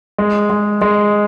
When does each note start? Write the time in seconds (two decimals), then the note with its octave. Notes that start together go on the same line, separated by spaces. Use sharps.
0.18 G#3
0.50 G#3
0.81 G#3